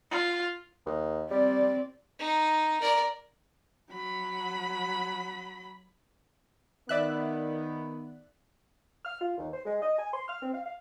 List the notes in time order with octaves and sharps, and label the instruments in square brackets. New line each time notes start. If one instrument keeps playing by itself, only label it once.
[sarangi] F4
[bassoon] D#2
[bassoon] G3 [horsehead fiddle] C4 D5
[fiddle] D#4
A#4 D5
[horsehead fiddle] F#3 B5
[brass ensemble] D#3 B3 [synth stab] D5 E5 F#6
[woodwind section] F6
F4
D#2
C5
G#3
D#5
G#5
C6
F6
C4
F5
F5